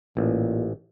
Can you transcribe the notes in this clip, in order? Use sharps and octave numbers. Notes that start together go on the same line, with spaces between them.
A1 A#2